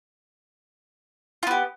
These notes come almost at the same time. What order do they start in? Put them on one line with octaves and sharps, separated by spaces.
F4 B3 G4